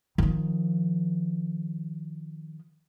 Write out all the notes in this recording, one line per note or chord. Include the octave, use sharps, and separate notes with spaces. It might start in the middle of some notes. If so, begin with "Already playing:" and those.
D#3 F3